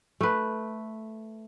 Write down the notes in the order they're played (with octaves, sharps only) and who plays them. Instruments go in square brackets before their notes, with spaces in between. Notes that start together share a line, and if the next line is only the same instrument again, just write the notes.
[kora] A3 B4